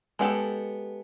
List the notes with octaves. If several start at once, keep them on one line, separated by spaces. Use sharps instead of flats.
G#3 B3 G4 A4